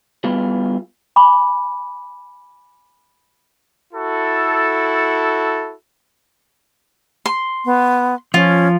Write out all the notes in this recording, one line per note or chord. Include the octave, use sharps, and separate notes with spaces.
G3 B3 E4 F4 G#4
G#5 B5 D6
E4 F#4 A4
C6
B3
F3 C#4 F4